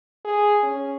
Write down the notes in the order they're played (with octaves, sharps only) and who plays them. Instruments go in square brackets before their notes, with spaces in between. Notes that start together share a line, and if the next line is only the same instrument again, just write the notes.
[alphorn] G#4
C#4